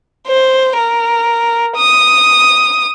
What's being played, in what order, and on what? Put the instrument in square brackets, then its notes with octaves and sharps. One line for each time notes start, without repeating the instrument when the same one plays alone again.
[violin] C5
A#4
D#6